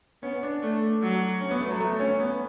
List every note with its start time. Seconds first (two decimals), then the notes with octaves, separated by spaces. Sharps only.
0.23 B3 C#4
0.43 D4
0.62 A3 D4
1.02 F#3
1.41 C#4
1.51 B3
1.61 A3
1.71 F#3
1.80 G3 A3
2.00 C#4
2.20 B3